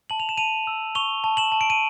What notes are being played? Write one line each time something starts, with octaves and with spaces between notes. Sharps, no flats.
A5 F#7
F7
E7
A5 D#7 F7
E6
C#6 F7 G7
A5
E7 F#7
A5
D7
D#7